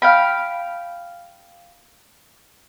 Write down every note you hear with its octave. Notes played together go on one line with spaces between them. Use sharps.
F5 G5 B5